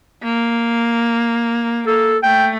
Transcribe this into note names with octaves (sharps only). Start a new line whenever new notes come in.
A#3
A#3 A4
A3 G5